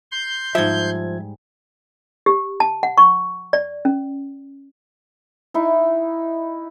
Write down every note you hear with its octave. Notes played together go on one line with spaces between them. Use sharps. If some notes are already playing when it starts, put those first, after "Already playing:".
C6 G6
G#2 F3 G3 E5 G#6
G4
A5
F#5
C#6
D5
C#4
D#4 E4